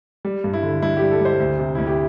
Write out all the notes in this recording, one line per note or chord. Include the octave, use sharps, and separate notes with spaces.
G3
G2
E4
D3
G2 E4
G4
G3
A4
G3 C5
D2
C3
D2 E4
G4